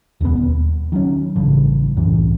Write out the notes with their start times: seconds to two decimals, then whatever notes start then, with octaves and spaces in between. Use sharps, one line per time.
0.21 E1 D2 A#2 B3
0.37 D#1
0.92 D#3 F#3 C#4
1.36 A1 G2 C#3
1.97 C2 F#2 A2 E3